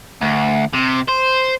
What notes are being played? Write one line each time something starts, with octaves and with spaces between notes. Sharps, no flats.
D2
C3
C5